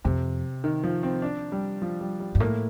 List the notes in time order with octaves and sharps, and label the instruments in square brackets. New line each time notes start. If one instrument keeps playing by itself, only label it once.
[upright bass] F2 [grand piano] C3
[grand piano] D#3
F3
C4
D4
G3
F3
G3
G3
[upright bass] G2
[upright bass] A2 [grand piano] A#3